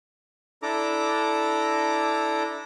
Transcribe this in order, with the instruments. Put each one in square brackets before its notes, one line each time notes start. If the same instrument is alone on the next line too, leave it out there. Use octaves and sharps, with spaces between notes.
[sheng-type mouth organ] D4 E4 A4 A#5 D6